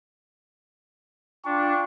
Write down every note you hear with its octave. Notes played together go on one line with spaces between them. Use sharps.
D4 F4 G5 C#6